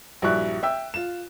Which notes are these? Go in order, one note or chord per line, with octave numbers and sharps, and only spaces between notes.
A#1 G2 F#3 E4 C#6 F#6
E5 G5 E6
F4 E7